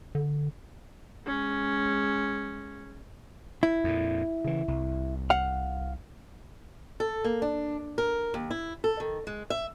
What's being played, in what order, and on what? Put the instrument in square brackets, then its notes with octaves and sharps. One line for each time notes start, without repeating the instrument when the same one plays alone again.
[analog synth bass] D3
[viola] G#3 C#4
[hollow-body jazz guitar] E4
[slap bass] F2 A#2
C#3 E3
C2
[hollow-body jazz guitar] F5 F#5
[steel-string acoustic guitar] A4
A#3
D4
A#4
D#2
E4
A4
D#3
G#3
E5